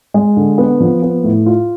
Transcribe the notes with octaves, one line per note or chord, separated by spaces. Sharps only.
G#3
D3
B3
F3
B3
A2
F4